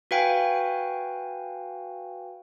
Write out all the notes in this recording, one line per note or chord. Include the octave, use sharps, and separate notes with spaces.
F#4 B4 F5 G5 G#5